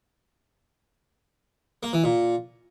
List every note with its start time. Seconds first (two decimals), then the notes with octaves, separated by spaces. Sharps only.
1.83 A#3
1.93 E3
2.04 A#2